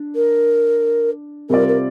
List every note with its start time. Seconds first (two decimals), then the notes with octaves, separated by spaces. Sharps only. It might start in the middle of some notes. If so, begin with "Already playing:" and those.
Already playing: D4
0.15 A#4
1.50 C3 G3 C4 F4 A#4 D5
1.68 A#4